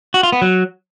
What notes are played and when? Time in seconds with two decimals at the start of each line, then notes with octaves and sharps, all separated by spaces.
0.14 F#4
0.23 F4
0.32 B3
0.42 F#3